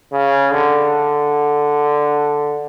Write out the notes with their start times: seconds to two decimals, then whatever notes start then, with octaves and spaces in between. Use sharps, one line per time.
0.13 C#3
0.52 D3